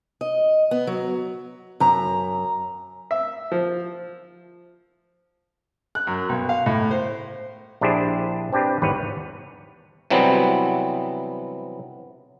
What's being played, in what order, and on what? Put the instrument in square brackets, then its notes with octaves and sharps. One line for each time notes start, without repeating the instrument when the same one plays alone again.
[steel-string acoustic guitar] D#5
B3
F#3
F#2 A#5
[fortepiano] E5
F3
F#6
F#2
B1
F5
A2
C5
[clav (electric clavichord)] A#1 D4 E4 G4 G#4 C5
C4 D4 G4 B4 G5
G#1 E2 G#2 G3 B4 C#5
C3 E3 F#3 G3 B3 C4